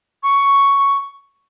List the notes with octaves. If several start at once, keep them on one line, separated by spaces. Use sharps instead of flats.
C#6